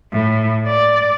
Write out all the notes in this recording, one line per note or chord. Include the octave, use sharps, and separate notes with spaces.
A2
D5